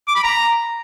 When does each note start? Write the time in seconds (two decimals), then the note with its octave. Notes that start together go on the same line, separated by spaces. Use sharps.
0.08 D6
0.16 B5
0.24 A#5